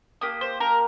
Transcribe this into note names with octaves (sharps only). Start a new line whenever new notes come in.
A#3 G4 D#6
C5
A#4